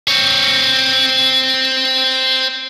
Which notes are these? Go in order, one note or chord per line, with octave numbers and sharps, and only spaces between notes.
C4 C#5